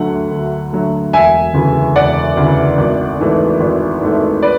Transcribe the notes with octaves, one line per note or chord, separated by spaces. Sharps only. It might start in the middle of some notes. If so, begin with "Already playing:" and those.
Already playing: D2 D3 F#3 A3 F#5
D2
D3 F#3 A3
E1 E5 G#5
D2 C#3 E3
E1 D5 F#5
D2 C#3 E3
G#1
G#2 E3 A3
G#1
G#2 E3 A3
B4 D5